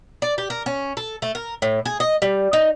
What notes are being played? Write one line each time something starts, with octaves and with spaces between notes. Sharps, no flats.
D5
G4
A#4
C#4
A4
A3
A#4
A2
G#4
D#5
G3
D#4